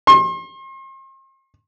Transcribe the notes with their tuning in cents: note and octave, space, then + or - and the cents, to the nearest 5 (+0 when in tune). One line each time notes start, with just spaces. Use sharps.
C6 +40